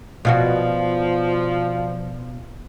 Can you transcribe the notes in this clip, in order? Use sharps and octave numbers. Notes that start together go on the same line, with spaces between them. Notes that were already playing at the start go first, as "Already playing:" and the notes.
B2 F3 F4 F#4 D5 F5